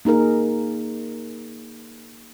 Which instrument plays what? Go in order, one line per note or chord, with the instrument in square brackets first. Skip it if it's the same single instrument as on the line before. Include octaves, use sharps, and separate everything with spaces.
[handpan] A#3 D#4 G#4 A#4